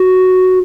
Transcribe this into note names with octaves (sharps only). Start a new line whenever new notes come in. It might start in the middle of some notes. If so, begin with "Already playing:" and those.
Already playing: F#4